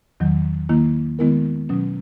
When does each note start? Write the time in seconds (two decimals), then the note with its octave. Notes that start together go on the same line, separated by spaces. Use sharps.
0.20 E2 D#3 F#3
0.69 D#3 A#3 E4
1.19 D#3 G#3 B3 E4 A#4
1.69 B2 F#3 C#4